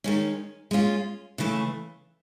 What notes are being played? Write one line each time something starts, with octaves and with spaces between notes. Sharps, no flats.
D#3 G#3 C#4
G#3 C#4 F4
C#3 E3 A3